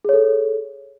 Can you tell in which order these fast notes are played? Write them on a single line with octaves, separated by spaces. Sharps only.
G#4 C#5 A4